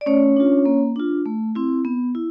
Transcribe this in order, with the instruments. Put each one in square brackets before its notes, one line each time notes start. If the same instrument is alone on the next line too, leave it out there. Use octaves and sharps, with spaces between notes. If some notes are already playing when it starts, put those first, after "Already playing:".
[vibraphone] D5
A3 C#4 C#5
D4 F4
A#3
D4 F4
A3
C4 E4
B3
E4